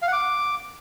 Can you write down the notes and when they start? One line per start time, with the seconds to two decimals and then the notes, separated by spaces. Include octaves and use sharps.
0.02 F5
0.07 F#5
0.13 D6